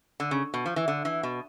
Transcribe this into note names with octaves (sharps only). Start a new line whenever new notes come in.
D3
C#3
B2
F3
E3
D3
E3
B2